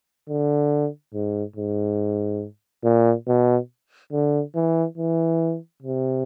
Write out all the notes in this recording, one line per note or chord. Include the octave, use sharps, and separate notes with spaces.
D3
G#2
G#2
A#2
B2
D3
E3
E3
C3